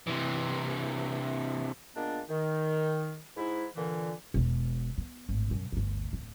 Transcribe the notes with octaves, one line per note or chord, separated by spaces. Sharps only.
C3 E3
A#2 G#3 A#3 B3 D4
D#3
G#2 E4
A#2 D3 E3
E1 B2
B3
G#1 A2
F#2 B2
G1 D2
D1